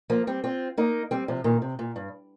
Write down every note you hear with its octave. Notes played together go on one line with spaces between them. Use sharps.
F3 A#3
G3 C4
C4 F4
A#3 D#4
G3 C4
C3 F3
A#2 D#3
C3
A#2
G2